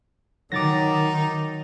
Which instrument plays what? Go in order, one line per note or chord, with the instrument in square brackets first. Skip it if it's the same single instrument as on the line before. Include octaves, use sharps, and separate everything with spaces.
[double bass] D#3 [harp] F#3 [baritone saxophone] D#4 [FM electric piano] D6 A6 A#6